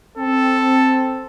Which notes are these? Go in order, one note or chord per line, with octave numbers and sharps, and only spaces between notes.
C4 A4